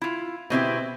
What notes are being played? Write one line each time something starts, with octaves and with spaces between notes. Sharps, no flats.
E4 F4
B2 C4 E4 G4